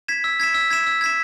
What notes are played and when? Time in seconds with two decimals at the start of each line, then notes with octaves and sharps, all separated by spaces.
0.08 G#6 B6 E7
0.24 E6
0.40 G#6 B6 E7
0.54 E6
0.70 G#6 B6 E7
0.87 E6
1.01 G#6 B6 E7